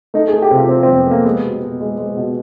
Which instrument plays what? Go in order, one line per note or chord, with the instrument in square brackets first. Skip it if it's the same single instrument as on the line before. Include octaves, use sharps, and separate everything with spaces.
[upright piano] A3 D#4
G#4
A3
G4
C3 F4
F3 C4
C4
F2
B3
A3 A#3
G#3 B3
B2
B2
G#3
G#3
B2